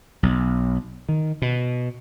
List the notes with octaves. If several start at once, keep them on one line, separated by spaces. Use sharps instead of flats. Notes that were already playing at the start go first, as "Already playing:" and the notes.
B1
D#3
B2